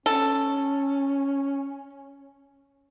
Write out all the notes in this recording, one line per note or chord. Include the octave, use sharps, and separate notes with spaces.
C#4 A4